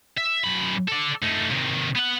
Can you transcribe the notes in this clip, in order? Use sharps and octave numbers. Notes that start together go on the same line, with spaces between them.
E5
F#2 B5
A4 D5
A3 D#4
C3 D#3
B3 F#5